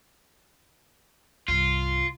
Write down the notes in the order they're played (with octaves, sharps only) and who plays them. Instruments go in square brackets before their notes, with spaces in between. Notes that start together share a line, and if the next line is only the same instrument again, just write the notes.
[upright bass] C2 G2 [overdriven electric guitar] F4